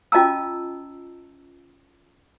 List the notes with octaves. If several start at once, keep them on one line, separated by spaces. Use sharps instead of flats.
C#4 F4 D#5 A5 A#5 E6